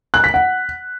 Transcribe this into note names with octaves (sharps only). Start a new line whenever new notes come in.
F#6
B6
F#5